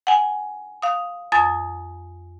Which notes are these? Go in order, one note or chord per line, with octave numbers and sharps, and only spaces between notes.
F#5 G#5
F5 D#6
F2 G#5 D#6 A6